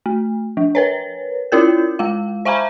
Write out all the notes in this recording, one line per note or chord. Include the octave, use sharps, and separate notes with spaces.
A3
F3
A#4 B4 C#5
C#4 E4 F4 A#4 G6
G#3 F5
C5 E5 F5 G#5 A#5 B5